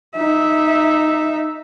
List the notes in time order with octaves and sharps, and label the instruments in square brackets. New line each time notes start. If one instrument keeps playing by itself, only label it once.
[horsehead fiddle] D#4 E5